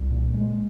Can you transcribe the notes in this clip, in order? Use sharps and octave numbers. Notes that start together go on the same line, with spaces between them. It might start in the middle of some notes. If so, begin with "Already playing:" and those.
Already playing: C2
A#2
G#3